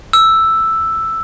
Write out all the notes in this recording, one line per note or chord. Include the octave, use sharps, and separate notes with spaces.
E6